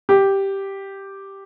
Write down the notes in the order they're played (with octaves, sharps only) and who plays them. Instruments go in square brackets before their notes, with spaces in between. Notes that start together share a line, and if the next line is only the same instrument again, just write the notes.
[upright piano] G4